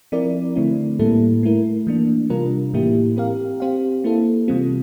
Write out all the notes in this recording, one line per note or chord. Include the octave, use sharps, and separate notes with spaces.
F3 C4 E4 A#4 D5
D3 A3 C4 E4
A2 G3 A#3 E4 A4
A3 E4 A#4
E3 A#3 D4
C3 G3 D4 F4 A#4
A2 E3 A#3 E4 G4
C4 G4 A#4 F5
C4 G4 C5 F5
A#3 E4 A4
C3 E3 G3 C4 F4